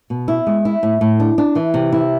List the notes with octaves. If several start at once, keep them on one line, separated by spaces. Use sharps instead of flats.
B2
E4
G#3
E4
A2
A2
D4
D4
E3
C3
E4